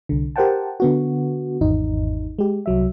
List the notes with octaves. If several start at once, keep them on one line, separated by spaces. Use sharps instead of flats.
C2 D3
G4 A#4 C5 F#5 G5 A5
D3 B3 F#4
G#1 E2 D#4
G#3 G4
C2 F#3 E5